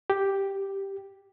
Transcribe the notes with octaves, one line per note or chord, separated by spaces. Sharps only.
G4